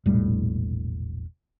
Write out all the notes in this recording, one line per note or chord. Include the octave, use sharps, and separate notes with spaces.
E1 A#1 A2 G3